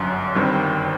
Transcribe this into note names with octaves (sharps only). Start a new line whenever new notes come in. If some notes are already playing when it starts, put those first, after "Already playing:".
Already playing: G1 F#2 D3 F#3
G1 G2 D#3 G3 C4